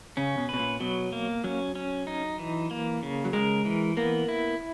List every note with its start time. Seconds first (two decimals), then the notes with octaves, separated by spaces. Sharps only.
0.17 C#3 C#4
0.38 B2
0.49 B2 B4
0.59 A#2
0.80 B2 F#3
1.12 A#3
1.44 F#3 C#4
1.76 C#4
2.07 D#4
2.39 E3
2.71 A#3
3.03 C#3
3.25 F#3
3.33 G#3 A#4
3.65 E3
3.97 A#3 B3
4.29 E4